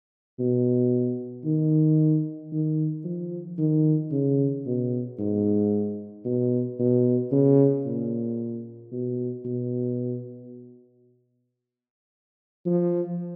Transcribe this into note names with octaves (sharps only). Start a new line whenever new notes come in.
B2
D#3
D#3
F3
D#3
C#3
B2
G#2
B2
B2
C#3
A#2
B2
B2
F3